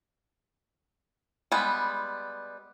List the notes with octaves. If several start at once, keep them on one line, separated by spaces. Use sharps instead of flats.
G3 G#3 B3